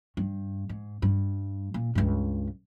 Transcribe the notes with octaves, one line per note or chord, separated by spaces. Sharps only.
G2
G#2
G2
A#2
C#2 G2